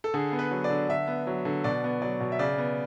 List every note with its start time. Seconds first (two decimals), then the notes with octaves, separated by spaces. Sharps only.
0.04 A4
0.14 D3 G#4
0.32 B3
0.39 B4
0.51 F#3
0.64 D5
0.70 D3
0.89 D3 E5
1.07 B3
1.27 F#3
1.45 D3
1.64 B2 D5
1.84 B3
2.02 F#3 D5
2.20 B2
2.32 E5
2.39 C#3 D5
2.58 B3